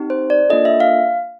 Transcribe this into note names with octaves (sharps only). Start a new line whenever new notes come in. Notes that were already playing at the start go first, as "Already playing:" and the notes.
Already playing: C4 D#4 G4
C5
D5
A#3 D4 F4 A4 D#5
E5
F5